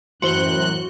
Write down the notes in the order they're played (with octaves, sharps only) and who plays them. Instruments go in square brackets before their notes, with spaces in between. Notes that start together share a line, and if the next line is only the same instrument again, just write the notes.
[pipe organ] F#2 F#6 [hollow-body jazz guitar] A2 E3 [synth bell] F#4 G7 [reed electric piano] C5 C6